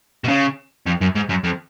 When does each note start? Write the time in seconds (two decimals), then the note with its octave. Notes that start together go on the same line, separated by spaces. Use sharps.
0.24 B2
0.28 C#3
0.87 F2
1.01 F#2
1.15 G#2
1.29 F#2
1.44 F2